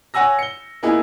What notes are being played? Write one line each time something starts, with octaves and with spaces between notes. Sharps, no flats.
C#5 F#5 G#5 E6 A#6
C#7 G7
A#3 B3 D#4 E4 G#4